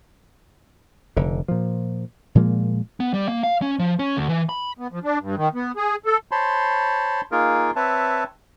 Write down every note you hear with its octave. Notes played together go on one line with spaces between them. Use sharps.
F1 D3
A#2 F3
A#2 F3 G#3 A#3
B3
G3
A#3
F5
C#4
F3
C#4
D2
E3
B5
B3
F3
D4
G2
D#3
B3
G#4
A4
C5 C#5 A5 B5 C6
A#3 D#4 F4 G#4 A#4
C4 B4 C#5 E5 A5